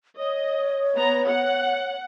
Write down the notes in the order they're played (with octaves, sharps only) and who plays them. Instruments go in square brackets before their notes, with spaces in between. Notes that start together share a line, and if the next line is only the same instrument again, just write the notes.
[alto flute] C#5 [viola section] D#5
[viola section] B3 A#5
F#5